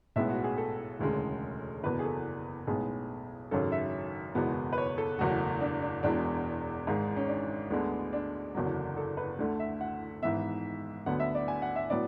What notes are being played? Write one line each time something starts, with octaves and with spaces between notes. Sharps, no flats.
B1 A2 G#3 B3 E5
F#4
G#4
A4
E1 D2 C#3 G#3
F#1 E2 B2 B4
G#4
A4
B1 A2 G#3 B3 G#4
G#1 F#2 C#3 F#3 A4
E5
F#1 E2 B2 G#3 B3
B4
C#5
A4
F#1 E2 B2 F#3 A3 F#4
D4
D4
E1 E2 B2 G#3 D4
G#1 G#2 G#3
C#4
D4
D2 D3 G#3 B3
D4
F#1 E2 D3 F#3
A4
B4
D2 D3 A3
E5
F#5
G#1 G#2 E3 B3 E5
D2 D3 F#3 B3 F#5
E5
D5
G#5
F#5
E5
A2 F#3 B3 D5